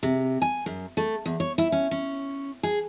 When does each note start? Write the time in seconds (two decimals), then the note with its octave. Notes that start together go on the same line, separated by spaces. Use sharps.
0.03 C3
0.42 G#5
0.66 F#2
0.97 A3
1.26 E2
1.40 C#5
1.58 E4
1.72 C#4
1.91 C#4
2.63 G#4